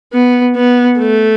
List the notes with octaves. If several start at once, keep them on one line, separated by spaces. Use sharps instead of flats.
B3
B3
A3